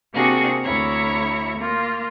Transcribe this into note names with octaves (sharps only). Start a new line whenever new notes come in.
C3 A#3 C4 D4 F#4 G#4
D2 E4 C#5 A#5
A#3 F4